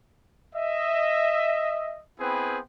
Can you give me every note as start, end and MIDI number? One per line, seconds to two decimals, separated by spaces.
0.55 2.00 75
0.55 2.00 76
2.19 2.58 59
2.19 2.58 60
2.19 2.58 64
2.19 2.58 68
2.19 2.58 71
2.19 2.58 79